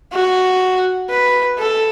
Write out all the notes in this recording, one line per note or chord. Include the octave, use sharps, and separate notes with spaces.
F#4
B4
A4